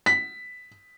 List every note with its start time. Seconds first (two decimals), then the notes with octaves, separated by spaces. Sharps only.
0.06 B6